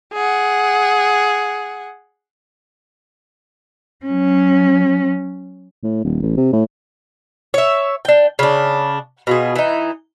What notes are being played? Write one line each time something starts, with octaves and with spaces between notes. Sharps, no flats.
G#4 F#5
F#3 C#4
A2
D#1
A1
C3
A2
C#5 E5
D4 G5
C#3 D4
B2 F4 G#4
E3 D#4